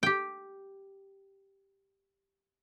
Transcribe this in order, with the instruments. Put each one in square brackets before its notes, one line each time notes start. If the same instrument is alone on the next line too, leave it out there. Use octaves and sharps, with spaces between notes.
[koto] G4 G5